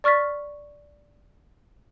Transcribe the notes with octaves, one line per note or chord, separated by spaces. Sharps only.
D5 C#6 F6 A6 B6